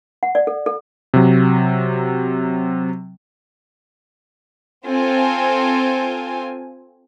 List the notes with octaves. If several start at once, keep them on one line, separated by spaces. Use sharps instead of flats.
F#5
D5
A4
A4
C3 F#3
C4 F4 A4 G#5